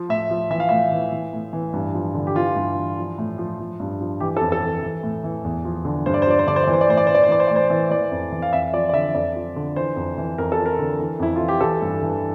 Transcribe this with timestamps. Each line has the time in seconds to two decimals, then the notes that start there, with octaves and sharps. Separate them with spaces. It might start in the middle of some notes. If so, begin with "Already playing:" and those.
Already playing: F3
0.09 A2 E5
0.30 F3
0.50 E3 E5
0.60 F5
0.69 A2 E5
0.92 E3
1.12 E3
1.33 A2
1.53 E3
1.73 G2
1.95 F3
2.15 D3
2.27 G4
2.35 E3 F4
2.56 G2
2.76 E3
2.98 F3
3.18 A2
3.38 F3
3.60 F3
3.80 G2
4.01 F3
4.20 E3 G4
4.37 A4
4.41 F2
4.52 A4
4.62 E3
4.83 E3
5.03 A2
5.24 E3
5.45 E2
5.65 F3
5.85 D3
6.06 G2 C5
6.14 D5
6.22 C5
6.26 F3 D5
6.39 C5
6.47 D3 D5
6.56 C5
6.64 E3 D5
6.73 C5
6.81 D5
6.89 A2 C5
6.97 D5
7.07 E3 C5
7.15 D5
7.24 C5
7.29 E3 D5
7.40 C5
7.48 A2 D5
7.56 C5
7.70 E3
7.91 E3 D5
8.11 F2
8.32 E3
8.42 F5
8.53 F2 E5
8.73 F3 D5
8.89 D5
8.93 D3 E5
9.14 F2 D5
9.35 F3
9.56 D3
9.76 E3 C5
9.96 F2
10.18 E3
10.38 F2 A#4
10.52 A4
10.58 F3
10.66 A#4
10.79 D3
10.99 E3
11.19 F2 E4
11.36 E3 F4
11.48 G4
11.61 E3 A4
11.82 G2
12.03 E3